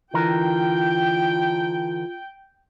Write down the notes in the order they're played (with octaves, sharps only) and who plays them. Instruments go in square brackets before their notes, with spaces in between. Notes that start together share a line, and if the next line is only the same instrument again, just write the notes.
[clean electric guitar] D3 E3 A#4 [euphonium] F4 [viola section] G5